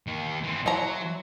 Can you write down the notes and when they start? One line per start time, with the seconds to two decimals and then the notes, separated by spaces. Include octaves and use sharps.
0.07 D#2 D#3
0.44 E3 C4
0.66 F#3 E4 C5 A#5